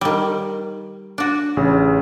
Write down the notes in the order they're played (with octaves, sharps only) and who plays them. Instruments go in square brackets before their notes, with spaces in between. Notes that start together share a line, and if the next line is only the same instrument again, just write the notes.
[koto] D#3 G3
D4 F#4
[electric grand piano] A1 C#3